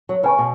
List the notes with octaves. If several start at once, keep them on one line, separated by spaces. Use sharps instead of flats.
F#3
C#3 B4 G#5 C#6
B2